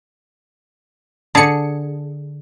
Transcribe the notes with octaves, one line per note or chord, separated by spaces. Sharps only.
D3 G#4 A5 C#7